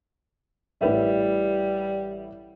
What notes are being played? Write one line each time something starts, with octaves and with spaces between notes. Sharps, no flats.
A1 G3 B4 E5